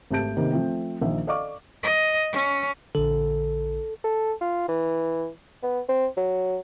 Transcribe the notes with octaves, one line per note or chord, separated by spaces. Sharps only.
G#1 A3 G4 A5 G6 D7
C3 D#3 A#3 B3
F3 A3 C4
A#1 D#3 E5
A4 D5 D#5 F5 C#6 D6
D#5
C#4
A#1 D3 A4
A4
F4
E3
B3
C4
F#3